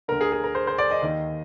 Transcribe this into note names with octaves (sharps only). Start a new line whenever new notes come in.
D2 D3 A#4
G#4
G#4
A#4
C5
C5
D5
D#5
D#2 D#3